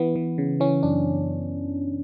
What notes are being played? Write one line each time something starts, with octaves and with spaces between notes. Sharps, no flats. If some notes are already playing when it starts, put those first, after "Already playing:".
Already playing: E3 B3
E3
C#3
E3 C#4
F#2 D4